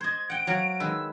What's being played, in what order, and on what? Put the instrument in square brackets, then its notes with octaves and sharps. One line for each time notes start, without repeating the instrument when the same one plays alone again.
[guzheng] C5 D#5 [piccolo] G#6
[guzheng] F#5 G5 [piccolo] D7
[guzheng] F#3 F5 F#5
[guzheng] D#3 G#3 B4 [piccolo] E6